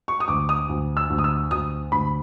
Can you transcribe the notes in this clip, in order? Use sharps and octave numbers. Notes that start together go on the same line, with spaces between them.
C#6
D#6
D2 D6
D#6
D2
E6
D2
D#6
E6
D2 D#6
D2 B5